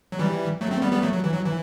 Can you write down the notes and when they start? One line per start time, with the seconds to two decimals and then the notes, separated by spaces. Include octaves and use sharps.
0.12 F#3
0.19 E3 G3
0.61 F#3 A3
0.71 A3 C4
0.82 G3 B3
0.92 G3 B3
1.02 F#3 A3
1.13 F#3
1.24 E3
1.33 F#3
1.44 E3